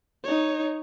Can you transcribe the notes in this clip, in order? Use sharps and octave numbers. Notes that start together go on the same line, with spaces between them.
D#4 C#5